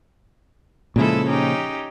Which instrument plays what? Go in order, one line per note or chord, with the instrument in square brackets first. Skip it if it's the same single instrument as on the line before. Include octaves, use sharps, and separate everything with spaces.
[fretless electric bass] A#2 C#3 F3 [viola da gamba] G#3 E4 A4
[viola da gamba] C#4 D#4 G4